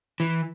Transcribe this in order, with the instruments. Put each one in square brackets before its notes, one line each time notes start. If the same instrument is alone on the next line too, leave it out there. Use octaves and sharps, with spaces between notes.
[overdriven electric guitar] E3